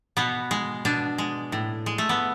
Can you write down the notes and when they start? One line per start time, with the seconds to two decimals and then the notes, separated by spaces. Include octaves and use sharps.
0.17 B2 B3
0.51 G#3
0.85 B2 D4
1.18 G#3
1.52 A2
1.86 G#3
1.98 A3
2.09 B3